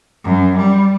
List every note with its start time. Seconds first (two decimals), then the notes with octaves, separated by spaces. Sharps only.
0.24 F#2
0.57 G3